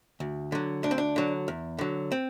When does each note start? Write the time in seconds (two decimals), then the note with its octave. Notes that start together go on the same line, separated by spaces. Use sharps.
0.20 D2
0.52 D3 F#3
0.83 D2 D4
0.91 C4
0.98 D4
1.16 D3 F#3
1.48 E2
1.78 D3 F#3
2.12 C4